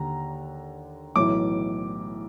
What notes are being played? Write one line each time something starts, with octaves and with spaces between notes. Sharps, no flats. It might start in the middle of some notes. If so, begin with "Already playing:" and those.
Already playing: D#2 D3 A#5
B1 A2 E3 D6